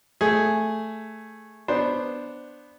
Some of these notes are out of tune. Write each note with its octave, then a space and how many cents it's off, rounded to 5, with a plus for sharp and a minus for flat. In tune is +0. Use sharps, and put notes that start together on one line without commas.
A3 +0 G#4 +0
B3 +0 D4 +0 C5 +0